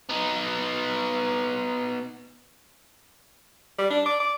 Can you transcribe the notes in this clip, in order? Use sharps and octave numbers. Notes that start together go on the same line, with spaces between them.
B3 D#4
G3
D4
D5
D5